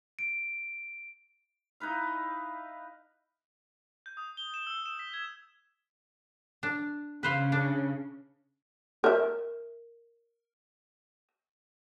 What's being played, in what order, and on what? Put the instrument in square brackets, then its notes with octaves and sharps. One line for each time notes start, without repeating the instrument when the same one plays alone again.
[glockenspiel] D7
[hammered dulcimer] D#4 E4 B4 F5
[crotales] G6
D#6
G7
E7
E6
E7
B6
G#6
[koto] D4
[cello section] C#3 [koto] B4 C5 F5
[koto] D4
[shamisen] A#4 E5